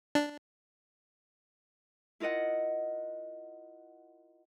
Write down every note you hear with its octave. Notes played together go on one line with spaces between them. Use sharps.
D4
E4 F4 A#4 D#5 F#5